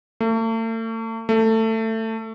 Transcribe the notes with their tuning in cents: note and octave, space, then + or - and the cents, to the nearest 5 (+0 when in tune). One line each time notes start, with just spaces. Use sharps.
A3 +40
A3 +20